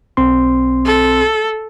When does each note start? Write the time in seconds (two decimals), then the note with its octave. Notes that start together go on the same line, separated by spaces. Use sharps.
0.17 B1 C4 C6
0.85 A4